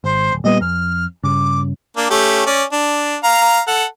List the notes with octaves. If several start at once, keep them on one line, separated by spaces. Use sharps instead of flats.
G#1 C5
D1
A#2 G3 B3 D#5
F2 F6
G2 C#3 D6
A#3 D4
A3 C#4 G4
C#4 D5
D4
F5 A#5
A4 F#5